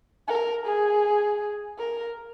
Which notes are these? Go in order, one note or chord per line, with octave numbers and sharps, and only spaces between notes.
A#4
G#4
A#4